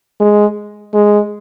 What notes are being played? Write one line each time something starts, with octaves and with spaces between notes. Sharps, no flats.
G#3
G#3